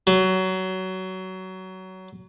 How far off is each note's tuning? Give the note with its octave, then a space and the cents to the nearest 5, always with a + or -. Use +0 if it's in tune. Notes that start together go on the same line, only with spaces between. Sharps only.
F#3 +20